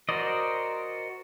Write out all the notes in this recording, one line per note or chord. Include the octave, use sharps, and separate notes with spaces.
F#4 A#4 C5 D5 D#5